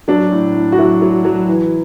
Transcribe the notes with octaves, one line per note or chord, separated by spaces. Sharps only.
F#3 D4
A2
A2
F#4
F#3 E4
F#3
F#3
E3